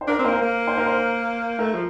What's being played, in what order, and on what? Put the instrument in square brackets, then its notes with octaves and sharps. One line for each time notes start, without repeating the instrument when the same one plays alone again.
[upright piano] C5
[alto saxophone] D4 [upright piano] A#4
[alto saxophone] C4
[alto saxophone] A#3 [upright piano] C5
[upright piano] A#4
[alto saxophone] A#3
[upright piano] C5
A#4
C5
[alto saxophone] A3 [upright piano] A#4
[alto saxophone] F3